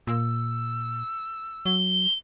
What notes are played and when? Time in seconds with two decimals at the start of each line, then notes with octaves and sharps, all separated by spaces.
0.07 A#2 E6
1.66 F#3 G7